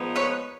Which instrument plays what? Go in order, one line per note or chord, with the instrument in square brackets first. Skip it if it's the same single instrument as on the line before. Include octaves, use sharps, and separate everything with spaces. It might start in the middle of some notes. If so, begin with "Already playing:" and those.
Already playing: [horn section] A#2 F3 G#3 B3 D#4
[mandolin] B4 C#5